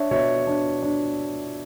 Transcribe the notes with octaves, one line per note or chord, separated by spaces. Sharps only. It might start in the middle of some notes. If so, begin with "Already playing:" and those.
Already playing: D4 C#5 E5
B2 C#5 E5
D4
D4